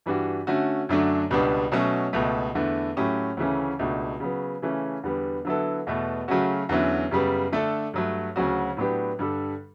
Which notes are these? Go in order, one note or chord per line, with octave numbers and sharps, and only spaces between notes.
G2 E3 G3 D4 F#4
D3 A3 C#4 F#4
F#2 D3 F#3 A3 D4
C#2 B2 G3 B3 D4
B2 F#3 A3 C#4
C#2 B2 A3
E2 D3 A3 E4
A2 F#3 A3 C#4 G4
D2 C#3 E3 A3 C#4
C#2 B2 A3 D4 F#4
C#3 F#3 B3
C#3 E3 A3 C#4
E2 D3 G3 B3
D3 F#3 B3 E4 A4
E2 B2 A3
C#3 F#3 A3 C#4 F#4
E2 D3 F#3 C#4 E4
F#2 C#3 G3 B3
D3 A3 D4 A4
G2 F#3 A3
D2 C#3 F#3 C#4 F#4
A2 F#3 B3 D4 G4
G2 D3 G3 D4 A4